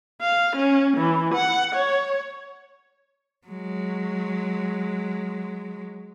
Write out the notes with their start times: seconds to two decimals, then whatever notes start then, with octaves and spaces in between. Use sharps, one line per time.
0.21 F5
0.56 C#4
0.97 E3
1.34 F#5
1.75 C#5
3.47 F#3 G#3